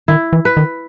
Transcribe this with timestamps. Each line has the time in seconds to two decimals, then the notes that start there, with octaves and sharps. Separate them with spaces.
0.08 D#3 E4
0.33 E3
0.45 B4
0.57 D#3